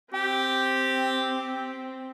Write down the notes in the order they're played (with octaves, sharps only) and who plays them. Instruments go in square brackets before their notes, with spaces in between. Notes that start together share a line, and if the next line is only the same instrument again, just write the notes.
[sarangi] C4 [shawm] G4 [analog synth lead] G5